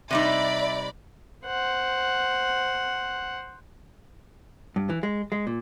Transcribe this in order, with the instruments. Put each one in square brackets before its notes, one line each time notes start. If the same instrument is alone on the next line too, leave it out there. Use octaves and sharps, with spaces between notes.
[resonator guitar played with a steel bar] C3 G3 D#4 [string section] D5 B5 [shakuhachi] E5
[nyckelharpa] C5 F#5
[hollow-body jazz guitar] G2
E3
G#3
G#3
A#2